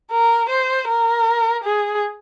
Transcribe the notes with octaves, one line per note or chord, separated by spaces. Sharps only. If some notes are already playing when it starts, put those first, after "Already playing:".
A#4
C5
A#4
G#4